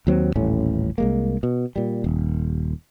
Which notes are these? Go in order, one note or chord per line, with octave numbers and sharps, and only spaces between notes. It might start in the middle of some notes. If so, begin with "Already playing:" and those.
D#2 F#3 C4
D#1 A1 A2 C#4
C2 G#3 A#3
B2
A#2 G3
D#1 D#2